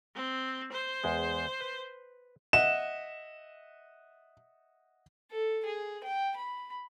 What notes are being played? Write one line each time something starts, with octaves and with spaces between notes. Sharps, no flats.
C4
C5
E2 G#3
B4
D#5 E5 F#5 E7
A4
G#4
G5
B5